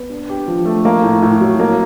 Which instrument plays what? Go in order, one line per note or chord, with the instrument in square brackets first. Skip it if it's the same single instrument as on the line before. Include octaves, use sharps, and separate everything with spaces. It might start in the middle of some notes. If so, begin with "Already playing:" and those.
Already playing: [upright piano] B3
D4
G4
F3
A3
A#3
A2
A2
F#3
A#3